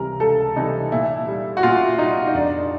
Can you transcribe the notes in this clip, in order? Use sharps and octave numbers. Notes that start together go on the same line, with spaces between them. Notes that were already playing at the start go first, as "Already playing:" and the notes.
Already playing: C#2 C3 E3 G3 A#4
C#2 A4
C3 E3 G3 D#4
A#2 E4
G3
F#4
A#2 F4
G3 D#4
D#4
F2 D4